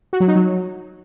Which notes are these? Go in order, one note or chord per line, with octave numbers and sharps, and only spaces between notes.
F#4
F#3
D#4
F#3